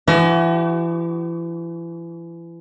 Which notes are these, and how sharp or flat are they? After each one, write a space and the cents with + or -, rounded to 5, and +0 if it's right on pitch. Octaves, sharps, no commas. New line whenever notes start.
E3 +35 D#4 -30 F#4 +45